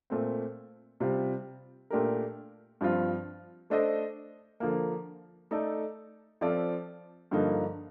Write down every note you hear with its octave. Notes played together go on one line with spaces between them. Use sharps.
A#2 A3 C4
C3 G3 C4 F4
A#2 A3 D4 G4 A#4
G2 F3 C4 F4
A3 D4 A4 C5 D#5
D3 F3 A#3
A3 D#4 A4 D5
F3 C4 F4 A4 D5
G2 D3 F3 A#3 D#4